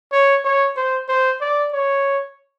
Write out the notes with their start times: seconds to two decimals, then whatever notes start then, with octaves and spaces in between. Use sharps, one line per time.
0.12 C#5
0.45 C#5
0.77 C5
1.09 C5
1.41 D5
1.73 C#5